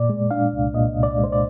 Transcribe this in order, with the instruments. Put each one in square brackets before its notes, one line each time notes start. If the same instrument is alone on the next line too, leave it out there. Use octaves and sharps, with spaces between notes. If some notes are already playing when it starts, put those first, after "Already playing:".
Already playing: [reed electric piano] A#2 D5
G#3
D4 F5
C2
A#2 D#5
C2
D5
G#3
C5
D5